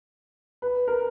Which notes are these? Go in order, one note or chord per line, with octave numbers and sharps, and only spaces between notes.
B4
A#4